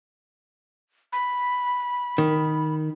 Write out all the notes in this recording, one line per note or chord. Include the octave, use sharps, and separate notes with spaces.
B5
D#3